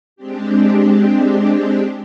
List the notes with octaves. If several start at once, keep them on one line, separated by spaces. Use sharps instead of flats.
G#3 C4 D4 G4